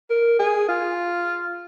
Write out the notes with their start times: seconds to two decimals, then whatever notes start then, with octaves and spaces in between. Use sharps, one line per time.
0.10 A#4
0.39 G#4
0.68 F4